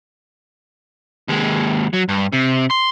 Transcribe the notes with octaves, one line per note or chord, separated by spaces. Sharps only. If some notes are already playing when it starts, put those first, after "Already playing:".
D#2 G#3
F#3
G2
C3
C6